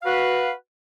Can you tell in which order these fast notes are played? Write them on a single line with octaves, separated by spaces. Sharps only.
F5 F#4 B4